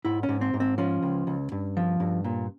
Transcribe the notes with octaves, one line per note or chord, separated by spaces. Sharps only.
G#2 E4
C#4
G#2
C4
G#2
C4
F3 C#4
C#2
C#2
G2
F3
G2
A#2